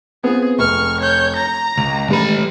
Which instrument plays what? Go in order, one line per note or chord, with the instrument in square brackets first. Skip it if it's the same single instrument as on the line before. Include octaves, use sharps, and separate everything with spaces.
[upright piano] B3 C4 F4 [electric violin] G#4
[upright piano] F1 [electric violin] C#6 F6
[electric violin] C#5 G6
A#5
[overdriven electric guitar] C#2 [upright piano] F7
[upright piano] A2 E3 G3 [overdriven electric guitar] G#3 B5